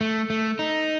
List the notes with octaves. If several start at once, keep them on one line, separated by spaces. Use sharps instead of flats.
A3
A3
D#4